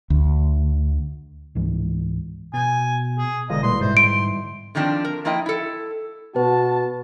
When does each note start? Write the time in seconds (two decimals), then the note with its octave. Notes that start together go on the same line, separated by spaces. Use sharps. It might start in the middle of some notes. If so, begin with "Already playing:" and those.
0.10 D2
1.55 C#2 G#2 E3
2.54 B2 G#5 G6 A6
3.18 G#4
3.50 E1 D3 F4 D#5
3.63 A#2 G3 E4 B4 C6
3.81 G#2 C5 D#5 E5 A6
3.97 C6 D7
4.75 D3 D#3 F3 C4 D4
5.05 A#4
5.25 F3 A#3 E4 D#5 G5
5.46 E4 A4
6.36 B2 F#4 B4 A5